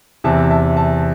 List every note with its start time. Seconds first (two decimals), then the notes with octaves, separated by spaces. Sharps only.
0.24 E2 C3 E3 E5 A5
0.51 E5 A5
0.77 E5 A5